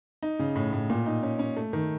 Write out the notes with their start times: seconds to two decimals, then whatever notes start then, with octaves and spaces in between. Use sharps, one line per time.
0.23 D#4
0.39 C#3
0.56 A2
0.73 A2
0.90 A#2
1.06 D#4
1.23 C#4
1.39 C#4
1.57 A3
1.73 D#3